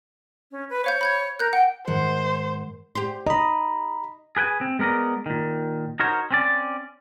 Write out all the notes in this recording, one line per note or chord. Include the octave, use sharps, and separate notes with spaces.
C#4
B4
C5 C#5 F5 G6
B5 G6 G#6
A#4 F#6 G6
F#5 G5
G#2 D#3 C5 F#5
G4 C5
D#5 A#5 B5
G#4 B4 G5 G#5
C4
G#3 B3 A#4 D5 D#5
A#2 D#3
D#4 F#4 A#4 C5 C#5
C4 C#4 D5